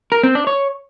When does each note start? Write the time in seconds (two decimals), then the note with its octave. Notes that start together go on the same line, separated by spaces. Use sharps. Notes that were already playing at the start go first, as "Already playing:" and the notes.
0.12 A#4
0.23 C4
0.35 D4
0.47 C#5